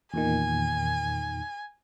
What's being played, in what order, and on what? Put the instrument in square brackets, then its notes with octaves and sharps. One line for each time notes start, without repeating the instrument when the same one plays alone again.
[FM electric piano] E2 A#2 D#3 [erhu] G#5